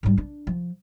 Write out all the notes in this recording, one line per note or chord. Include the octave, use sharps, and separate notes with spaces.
G#2 G3
D4
F3